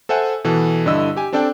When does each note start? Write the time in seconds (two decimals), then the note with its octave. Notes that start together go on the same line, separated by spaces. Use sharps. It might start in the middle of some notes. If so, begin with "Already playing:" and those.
0.09 A4 C5 E5 F#5 G#5
0.44 B2 E3 A4
0.86 G2 D3 E4 D#5 E6
1.17 G4 G#5
1.33 C4 D4 A4 D5 G5